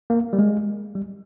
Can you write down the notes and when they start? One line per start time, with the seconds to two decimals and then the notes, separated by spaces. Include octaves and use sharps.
0.10 A#3
0.33 G3
0.39 G#3
0.95 G3